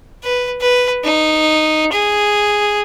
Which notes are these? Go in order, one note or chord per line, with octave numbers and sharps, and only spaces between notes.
B4
B4
D#4
G#4